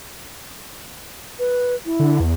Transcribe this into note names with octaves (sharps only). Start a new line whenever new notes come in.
B4
E4
D3
E2